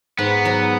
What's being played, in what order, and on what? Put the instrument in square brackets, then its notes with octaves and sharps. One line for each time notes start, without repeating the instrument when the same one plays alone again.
[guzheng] G#2 [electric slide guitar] B3
[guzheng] F#3